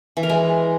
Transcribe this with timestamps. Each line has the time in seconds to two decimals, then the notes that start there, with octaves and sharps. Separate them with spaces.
0.17 E3
0.23 A#4
0.29 G#3